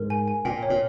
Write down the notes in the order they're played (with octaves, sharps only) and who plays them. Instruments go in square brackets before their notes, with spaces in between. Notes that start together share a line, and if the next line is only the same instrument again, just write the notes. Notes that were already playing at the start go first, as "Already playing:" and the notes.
Already playing: [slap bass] G#2 [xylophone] A#4
[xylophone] G#5
G#5
[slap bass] A#2 [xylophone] G5
[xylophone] C#5
[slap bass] A#2